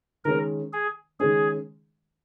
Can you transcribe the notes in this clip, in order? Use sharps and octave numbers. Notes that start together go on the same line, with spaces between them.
D#3 G#3 C#4 A#4
G#4
D#3 G#3 C#4 G#4